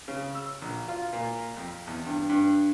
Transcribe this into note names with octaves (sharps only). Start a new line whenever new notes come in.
C#3
E6
A#1
F4
A#2
F2
E2
G2
G2